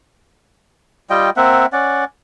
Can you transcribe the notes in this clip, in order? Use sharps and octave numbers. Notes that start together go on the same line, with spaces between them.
G3 F4 D#5 G5
A#3 C4 E5 F#5
C#4 D5 F#5